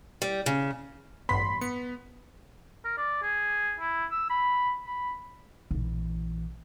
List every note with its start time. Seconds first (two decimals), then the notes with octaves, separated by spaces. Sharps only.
0.22 G3
0.46 C#3
1.29 A1 G2 B3 B5 C6 B6
1.61 B3 C#7
2.85 A#4
2.97 D5
3.23 G#4
3.80 E4
4.11 E6
4.30 B5
4.86 B5
5.71 A#1 E3